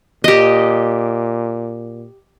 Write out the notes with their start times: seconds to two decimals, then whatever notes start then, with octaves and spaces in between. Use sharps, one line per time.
0.24 A#2 G4 D#5